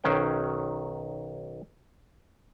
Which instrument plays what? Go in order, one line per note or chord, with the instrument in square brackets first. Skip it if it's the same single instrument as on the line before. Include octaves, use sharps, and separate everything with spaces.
[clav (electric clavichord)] B1 D#3 F#3 C#4 C5 G5